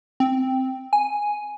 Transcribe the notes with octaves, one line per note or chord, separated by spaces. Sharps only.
C4
G#5